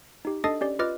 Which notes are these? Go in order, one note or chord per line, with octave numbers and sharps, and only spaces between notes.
D#4 G4
D4 A4 D#5 D#6 A6 C7
C#4 G4 D5
F4 B4 D#5 D6 F6 A6